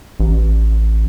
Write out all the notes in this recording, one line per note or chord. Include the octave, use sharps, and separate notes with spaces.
A1